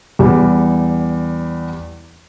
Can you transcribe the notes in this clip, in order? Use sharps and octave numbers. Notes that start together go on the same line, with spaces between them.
E2 G3